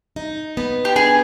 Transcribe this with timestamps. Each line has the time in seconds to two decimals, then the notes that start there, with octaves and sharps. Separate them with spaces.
0.16 D#4
0.57 B3
0.85 G4
0.96 D4 G#4